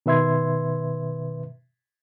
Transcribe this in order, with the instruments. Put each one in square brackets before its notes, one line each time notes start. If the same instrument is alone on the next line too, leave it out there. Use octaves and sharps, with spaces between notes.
[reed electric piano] B2 D#3 B4 E5 C6 G#6